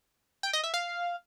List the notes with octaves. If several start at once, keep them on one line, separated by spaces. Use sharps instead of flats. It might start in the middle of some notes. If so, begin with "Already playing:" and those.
G5
D#5
E5
F5